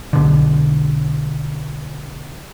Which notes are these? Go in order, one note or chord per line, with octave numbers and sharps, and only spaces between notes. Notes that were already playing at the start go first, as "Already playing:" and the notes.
B1 B2 D3